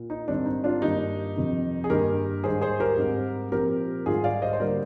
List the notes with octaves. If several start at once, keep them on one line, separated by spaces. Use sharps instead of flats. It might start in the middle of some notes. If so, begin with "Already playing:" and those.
Already playing: A#2
D#4
G#2 D#3 G3 C4 D4
D#4
D4 F4
G2 D#3 A#3 D#4 G4
F2 C3 D#3
G#4
G2 D#3 A#3 G4 A#4
G#2 D#3 G3 G#4 C5
G#4 C5
G4 A#4
G#2 G3 C4
A#2 F3 C4 G4 A#4
G#2 D#3 G3 F4 G#4
D5 F5
C5 D#5
C5
D3 G3 A#3 A#4 D5